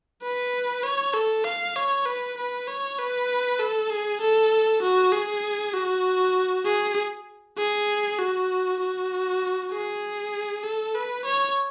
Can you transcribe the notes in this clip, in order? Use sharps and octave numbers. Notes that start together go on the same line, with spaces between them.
B4
C#5
A4
F5
C#5
B4
B4
C#5
B4
A4
G#4
A4
F#4
G#4
F#4
G#4
G#4
F#4
F#4
G#4
A4
B4
C#5